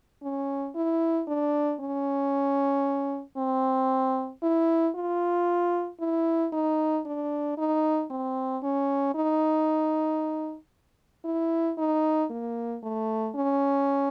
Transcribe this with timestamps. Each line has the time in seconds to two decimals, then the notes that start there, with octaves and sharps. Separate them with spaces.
0.23 C#4
0.75 E4
1.28 D4
1.80 C#4
3.37 C4
4.43 E4
4.95 F4
6.00 E4
6.53 D#4
7.06 D4
7.58 D#4
8.10 C4
8.63 C#4
9.15 D#4
11.25 E4
11.78 D#4
12.30 A#3
12.83 A3
13.35 C#4